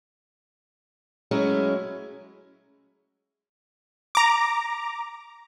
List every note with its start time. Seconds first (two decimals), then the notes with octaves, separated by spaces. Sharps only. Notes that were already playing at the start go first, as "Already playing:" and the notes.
1.31 F#3 G#3 A3 C#4 E4
4.15 A#5 D6